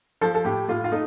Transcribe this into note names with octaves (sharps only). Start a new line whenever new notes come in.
F3 A4
A4
A2 G4
A2 F4
F4
A3 D#4